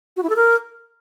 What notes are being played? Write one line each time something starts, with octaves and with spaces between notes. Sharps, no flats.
F#4
E4
A4
A#4